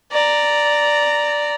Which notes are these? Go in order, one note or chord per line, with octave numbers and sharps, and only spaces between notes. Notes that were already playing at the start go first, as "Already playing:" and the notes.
D5 A#5